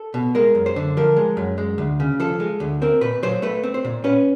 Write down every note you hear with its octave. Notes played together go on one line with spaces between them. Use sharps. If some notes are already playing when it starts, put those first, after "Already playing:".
Already playing: A4
B2
G#3 A#4
F#2
C5
D3
F3 A#4
G#3
F#2
G#3
D2
C#3
F3 A4
G#3
D2
C4 A#4
A#2 B4
F#3 C5
A3 B4
C4
C5
A#2
C#4 B4